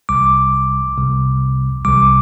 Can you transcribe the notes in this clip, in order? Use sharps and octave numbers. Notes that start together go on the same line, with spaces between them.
C2 C3 G3 D6
C2 C3 G3
C2 C3 G3 D6